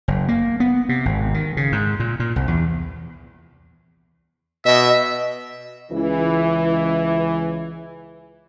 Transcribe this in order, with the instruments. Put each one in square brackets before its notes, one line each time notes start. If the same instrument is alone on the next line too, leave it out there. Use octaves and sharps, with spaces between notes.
[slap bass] F#1
A#3
B3
C3
G#1
D#3
C#3
G#2
A#2
A#2
C2
E2
[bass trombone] B2 [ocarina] D#5 [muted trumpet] E5
[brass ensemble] C#2 E3